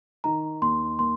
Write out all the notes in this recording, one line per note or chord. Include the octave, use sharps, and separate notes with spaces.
D#3 A#5
D#2 C6
A#3 C6